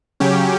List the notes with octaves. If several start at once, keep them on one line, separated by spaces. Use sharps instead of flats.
C#3 F#3 C#4 G4